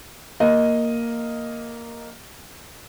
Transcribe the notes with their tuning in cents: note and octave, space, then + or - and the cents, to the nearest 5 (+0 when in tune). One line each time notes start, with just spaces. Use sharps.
A#3 +0 D#5 +0